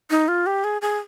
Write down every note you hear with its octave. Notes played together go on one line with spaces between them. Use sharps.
D#4
F4
G4
G#4
G#4